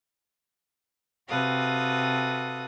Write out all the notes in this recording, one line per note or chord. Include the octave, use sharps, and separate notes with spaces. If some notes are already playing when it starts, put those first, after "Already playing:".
C3 F#4 A4 B4 F5 D#6